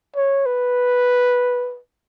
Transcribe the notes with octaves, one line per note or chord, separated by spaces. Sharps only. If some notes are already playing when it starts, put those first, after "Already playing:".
C#5
B4